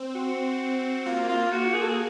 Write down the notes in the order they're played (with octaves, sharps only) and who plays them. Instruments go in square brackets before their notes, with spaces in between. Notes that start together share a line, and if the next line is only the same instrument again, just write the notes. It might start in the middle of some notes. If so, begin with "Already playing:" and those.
Already playing: [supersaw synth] C4
[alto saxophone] F#4
[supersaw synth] A#3 [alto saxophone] F4
[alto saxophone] F4
F#4
G#4
A4
G#4